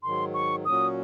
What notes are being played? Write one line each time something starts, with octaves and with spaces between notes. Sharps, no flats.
G#2 D#3 F#3 C6
C#6
A#2 F#3 C#4 F#4 D#6